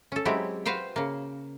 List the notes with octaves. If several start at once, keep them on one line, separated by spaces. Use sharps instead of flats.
C#4 A4
F#3 G#3 C4 E4 G4
F#4 B4 C5 F5 G5
C#3 A#3